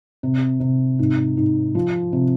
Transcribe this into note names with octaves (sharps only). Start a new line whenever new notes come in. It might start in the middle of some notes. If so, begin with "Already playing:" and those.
C3
C3
G#2
G#2
F3
C3